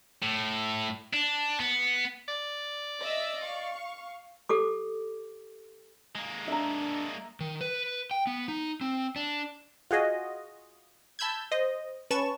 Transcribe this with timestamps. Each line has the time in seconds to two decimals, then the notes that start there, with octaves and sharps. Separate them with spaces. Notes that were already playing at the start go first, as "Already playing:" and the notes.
0.23 A2
1.13 D4
1.60 B3
2.28 D5
3.01 D#5 E5 E6
3.41 F5 C#6
4.49 G4 A4 D6
6.15 G#3 A#3
6.48 D4 E5 A#5
7.40 D#3
7.61 B4
8.11 G5
8.27 B3
8.48 D#4
8.81 C4
9.16 D4
9.91 F4 F#4 G#4 D#5
11.19 A5 B5 E6 G6 G#6
11.52 C5 D#5
12.10 C#4 B4 A5 C#6 E7